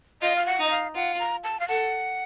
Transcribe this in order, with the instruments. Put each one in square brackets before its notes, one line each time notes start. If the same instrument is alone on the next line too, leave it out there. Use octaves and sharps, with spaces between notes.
[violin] F4 [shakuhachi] D#5
[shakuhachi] F5
F#5
[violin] D#4
[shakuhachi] D#5
F5
[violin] F4 [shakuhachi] F#5
[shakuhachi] A#5
A5
F5
[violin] A4 [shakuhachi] F#5